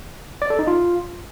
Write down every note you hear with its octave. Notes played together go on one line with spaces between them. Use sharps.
D5
A4
D#4
F4